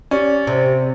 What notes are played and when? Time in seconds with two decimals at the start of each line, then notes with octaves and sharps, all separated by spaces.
0.11 C#4 G4 D5
0.47 C3